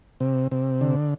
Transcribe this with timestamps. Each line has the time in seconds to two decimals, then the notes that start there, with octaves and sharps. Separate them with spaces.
0.20 C3
0.52 C3
0.81 D3